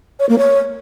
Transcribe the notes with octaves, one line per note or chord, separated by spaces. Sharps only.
C#5
A#3
C#5